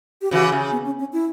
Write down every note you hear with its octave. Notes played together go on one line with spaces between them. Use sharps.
G4
C#3 E3 F#4
C#3
B3
C#4
C#4
E4